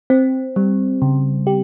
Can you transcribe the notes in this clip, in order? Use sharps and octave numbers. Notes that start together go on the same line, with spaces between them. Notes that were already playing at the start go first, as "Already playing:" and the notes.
C4
G3
C#3
G4